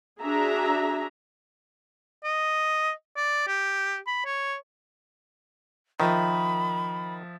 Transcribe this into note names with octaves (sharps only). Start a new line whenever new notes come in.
D4 F#4 G#4 E5 A#5
D#5
D5
G4
B5
C#5
D#3 F3 E5 B5 D#6